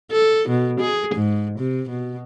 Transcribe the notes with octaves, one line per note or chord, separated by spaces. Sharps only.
A4
B2
G#4
G#2
C3
B2